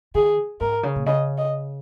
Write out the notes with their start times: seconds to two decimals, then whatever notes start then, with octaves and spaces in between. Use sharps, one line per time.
0.15 D#3 G#4
0.61 G#2 A#4
0.83 C#3
0.96 A#2
1.06 C#3 D#5
1.38 D#5